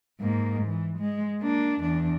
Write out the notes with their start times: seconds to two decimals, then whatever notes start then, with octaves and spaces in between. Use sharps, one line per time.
0.21 G#2 A#3
0.66 E3
0.99 G#3
1.41 A#3 D4
1.81 E2 D4